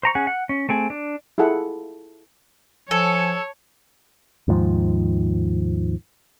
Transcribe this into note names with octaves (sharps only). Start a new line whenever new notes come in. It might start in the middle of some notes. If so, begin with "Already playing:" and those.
C5 A#5 C#6
C#4 G#4 F#5
F#5
C#4
A3 C4 G#4
D4
E4 F4 G#4 A4 F#5
F3 A4 C#5 G#5
D#2 G#2 F3